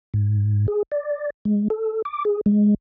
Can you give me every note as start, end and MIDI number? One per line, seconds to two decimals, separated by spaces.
0.14 0.67 44
0.68 0.83 68
0.92 1.30 74
1.45 1.68 56
1.70 2.02 69
2.05 2.25 86
2.25 2.41 68
2.46 2.74 56